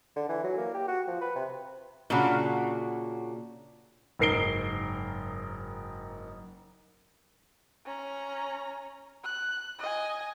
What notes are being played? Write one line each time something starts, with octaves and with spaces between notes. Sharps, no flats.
D3
E3
F#3
A#3
G4
F#4
F3
B4
C3
A#2 C#3 D4 F#4
F#1 G#2 A#4 C7 D7 G7
C#4 A#5
F#6
D#5 G#5